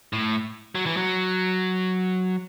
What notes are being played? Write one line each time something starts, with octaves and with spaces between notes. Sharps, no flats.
A2
F#3
E3
F#3